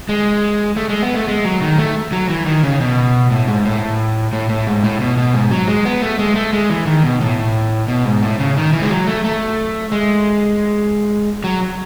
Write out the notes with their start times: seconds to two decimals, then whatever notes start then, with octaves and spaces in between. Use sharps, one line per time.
0.09 G#3
0.77 A3
0.89 G#3
1.02 B3
1.15 A3
1.28 G#3
1.45 F#3
1.61 D#3
1.78 A3
2.12 F#3
2.29 E3
2.46 D#3
2.63 C#3
2.80 B2
3.31 A2
3.48 G#2
3.65 A2
4.33 A2
4.49 A2
4.67 G#2
4.84 A2
5.00 B2
5.17 B2
5.34 G#2
5.51 F#3
5.68 G#3
5.85 B3
6.02 A3
6.19 G#3
6.36 A3
6.53 G#3
6.70 E3
6.87 D#3
7.04 B2
7.21 A2
7.88 B2
8.05 G#2
8.23 A2
8.39 C#3
8.57 D#3
8.73 E3
8.82 G#3
8.90 F#3
9.07 A3
9.24 A3
9.92 G#3
11.44 F#3